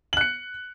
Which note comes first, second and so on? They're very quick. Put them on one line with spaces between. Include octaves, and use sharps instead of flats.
F#7 F#6 C#7